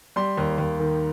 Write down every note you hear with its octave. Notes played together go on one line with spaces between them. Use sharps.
G3 C6
D#2
D#2
D#3